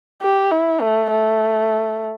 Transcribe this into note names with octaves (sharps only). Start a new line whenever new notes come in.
G4
E4
A3
A3